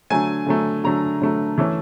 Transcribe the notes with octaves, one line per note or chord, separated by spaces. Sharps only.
D3 F#3 A3 G#5
D3 F#3 A3
D3 F#3 A3 A#5
D3 F#3 A3
E3 A3 C#4